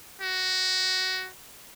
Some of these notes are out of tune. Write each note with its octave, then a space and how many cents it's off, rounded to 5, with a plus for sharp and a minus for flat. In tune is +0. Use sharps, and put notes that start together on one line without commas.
F#4 +15